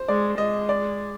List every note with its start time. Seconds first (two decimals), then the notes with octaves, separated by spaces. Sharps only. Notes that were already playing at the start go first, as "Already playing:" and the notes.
Already playing: C5
0.08 G#3 D5
0.38 G#3 D#5
0.69 D5